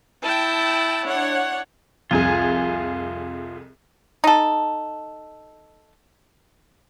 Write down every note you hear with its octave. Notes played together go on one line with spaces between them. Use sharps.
E4 G5 A5
D4 C#5 F#5
C2 F2 F4 G#4 G#5
D#4 A4